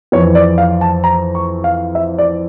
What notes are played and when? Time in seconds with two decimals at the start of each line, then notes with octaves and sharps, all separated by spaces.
0.12 F2 E3 C#5
0.35 D5
0.58 F5
0.81 A5
1.04 A#5
1.35 C#6
1.64 F5
1.95 E5
2.19 D5